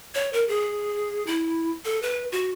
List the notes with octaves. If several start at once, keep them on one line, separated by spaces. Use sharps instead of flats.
C#5
A#4
G#4
E4
A4
B4
F#4